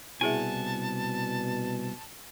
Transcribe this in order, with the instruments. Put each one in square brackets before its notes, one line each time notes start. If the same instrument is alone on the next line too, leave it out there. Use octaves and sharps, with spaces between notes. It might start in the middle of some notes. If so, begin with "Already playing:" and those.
[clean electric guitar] C2 F#5 G#5 [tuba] B2 [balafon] E4 G#4 E5 [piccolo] A5